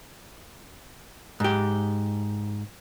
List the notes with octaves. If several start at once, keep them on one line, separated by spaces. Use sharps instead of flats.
G#2 G4